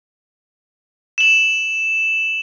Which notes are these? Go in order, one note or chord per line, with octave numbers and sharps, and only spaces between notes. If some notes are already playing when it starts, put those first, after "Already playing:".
E7 F#7